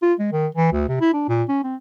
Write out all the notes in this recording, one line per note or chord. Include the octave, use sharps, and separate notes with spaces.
F4
G#3
D#3
E3
D2
C3
E4
D4
A#2
C#4
C4